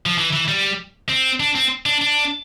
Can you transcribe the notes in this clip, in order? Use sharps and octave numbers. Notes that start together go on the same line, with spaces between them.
F3
E3
E3
G3
C4
D4
C4
D4
D4